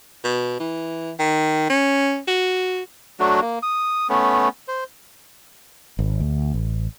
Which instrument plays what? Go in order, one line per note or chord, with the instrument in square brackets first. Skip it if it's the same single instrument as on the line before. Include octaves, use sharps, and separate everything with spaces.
[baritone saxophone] B2
E3
D#3
C#4
F#4
[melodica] F#3 A3 D4 F#4
A#3
D#6
A3 B3 C#4
C5
[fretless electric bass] G#1
D2
A1